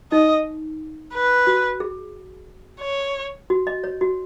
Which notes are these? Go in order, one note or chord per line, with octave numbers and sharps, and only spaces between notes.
D#4 D#5
B4
F#4
G#4
C#5
F#4
D#5
C#5
F#4